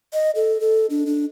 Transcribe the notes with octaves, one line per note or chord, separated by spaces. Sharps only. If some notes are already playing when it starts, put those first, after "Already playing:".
D#5
A4
A4
D4
D4